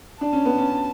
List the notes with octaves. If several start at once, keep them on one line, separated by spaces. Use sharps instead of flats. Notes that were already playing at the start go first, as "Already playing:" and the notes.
D4 A5
C#4
B3
C#4